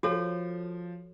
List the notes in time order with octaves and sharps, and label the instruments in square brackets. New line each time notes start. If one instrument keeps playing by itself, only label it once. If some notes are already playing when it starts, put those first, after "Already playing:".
[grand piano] F3 [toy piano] F#4 A4 C#5